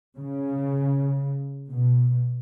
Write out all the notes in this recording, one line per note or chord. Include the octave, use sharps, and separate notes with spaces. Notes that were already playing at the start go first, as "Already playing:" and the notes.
C#3
B2